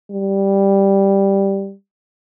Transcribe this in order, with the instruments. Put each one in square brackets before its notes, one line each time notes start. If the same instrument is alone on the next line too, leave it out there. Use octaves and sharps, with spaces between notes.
[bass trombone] G3